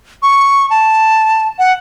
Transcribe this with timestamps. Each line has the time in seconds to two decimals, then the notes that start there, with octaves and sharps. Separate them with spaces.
0.23 C#6
0.70 A5
1.59 F#5